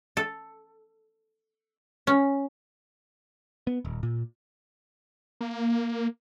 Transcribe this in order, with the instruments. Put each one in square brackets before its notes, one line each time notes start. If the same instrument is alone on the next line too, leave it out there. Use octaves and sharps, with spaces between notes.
[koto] A4
C#4
[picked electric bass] B3
D#1
A#2
[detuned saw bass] A#3